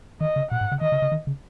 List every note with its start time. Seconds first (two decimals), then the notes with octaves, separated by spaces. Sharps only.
0.21 D#3 D#5
0.36 C#3
0.51 A#2 F#5
0.61 G#2
0.72 C#3
0.81 D#3 D#5
0.92 C#3
1.02 C#3
1.11 D#3
1.27 C#3